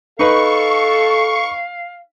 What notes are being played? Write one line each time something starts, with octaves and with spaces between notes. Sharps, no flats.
D#4 A4 B4 F5 C#6